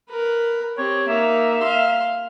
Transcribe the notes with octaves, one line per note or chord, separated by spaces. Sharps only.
A#4 B4
C4 G4 C#5
A#3 D#4 E5
F5 C6